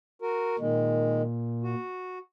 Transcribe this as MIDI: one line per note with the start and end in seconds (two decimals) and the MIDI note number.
0.22 0.56 66
0.22 0.56 70
0.59 1.75 46
0.59 1.22 51
0.59 1.22 56
1.64 2.19 66